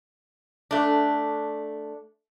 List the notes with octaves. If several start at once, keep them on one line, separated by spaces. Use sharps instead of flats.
A3 D4